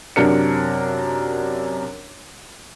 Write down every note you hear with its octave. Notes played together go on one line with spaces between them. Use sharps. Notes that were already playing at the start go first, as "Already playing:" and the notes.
F#2 C3 D4 A#4 C#7